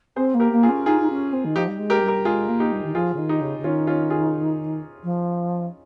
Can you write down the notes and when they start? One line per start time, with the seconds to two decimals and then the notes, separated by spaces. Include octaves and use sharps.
0.16 C4 G#4 C5
0.34 A#3
0.40 G4 A#4
0.52 A#3
0.63 F4 G#4
0.69 C#4
0.86 D#4 F4 G#4
1.00 D#4
1.09 C#4
1.33 C4
1.45 D#3
1.56 F3 D#4 G4
1.67 G3
1.79 G#3
1.90 G4 A#4
2.02 G3
2.08 G4 A#4
2.25 G#3 F4 G#4
2.48 A#3
2.60 D#4 G4
2.72 G3
2.83 D#3
2.95 F3 F4 G#4
3.14 C#3
3.17 D#3
3.29 D#4 G4
3.41 C#3
3.58 C#3
3.64 D#3 C#4 F4
3.87 C#4 F4
4.10 F4 G#4
5.03 F3